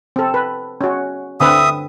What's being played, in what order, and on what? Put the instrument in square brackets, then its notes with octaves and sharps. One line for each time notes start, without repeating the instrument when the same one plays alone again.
[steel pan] C4 A4
B4
C#4 F#4
[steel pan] D3 C4 B4 [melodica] E5 D#6